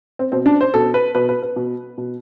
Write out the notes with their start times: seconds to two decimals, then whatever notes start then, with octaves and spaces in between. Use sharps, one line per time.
0.19 C4
0.32 B2 C4
0.46 D4
0.61 C5
0.74 B2 A4
0.94 B4
1.15 B2 B4
1.29 B4
1.42 B4
1.56 B2
1.98 B2